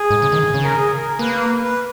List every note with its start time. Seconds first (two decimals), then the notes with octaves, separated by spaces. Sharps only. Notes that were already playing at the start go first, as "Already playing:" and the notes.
Already playing: G#4
0.10 G#2
0.22 C#3
0.32 D#3
0.54 C#3
0.64 A#4
0.76 G#4
0.97 A#4
1.19 A#3 B4
1.64 B4